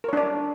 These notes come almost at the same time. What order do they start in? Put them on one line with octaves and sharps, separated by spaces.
A#4 C#5 D4 D5